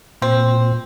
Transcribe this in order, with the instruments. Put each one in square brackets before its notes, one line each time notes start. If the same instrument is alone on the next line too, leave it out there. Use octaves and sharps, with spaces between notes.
[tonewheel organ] A#2 [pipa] C4